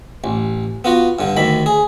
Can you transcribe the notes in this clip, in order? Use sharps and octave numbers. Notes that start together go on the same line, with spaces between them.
A1
B3 F4 F#4
G2 D3
D2 D#3 B5
G#4